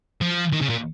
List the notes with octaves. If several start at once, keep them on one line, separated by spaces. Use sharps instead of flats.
F3
D#3
C#3
A#2